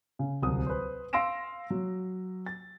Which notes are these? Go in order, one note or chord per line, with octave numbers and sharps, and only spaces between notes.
C#3
D1 C2 D#6
B4 C5
F5 C6 E6 A#6 D7 E7
F#3
A6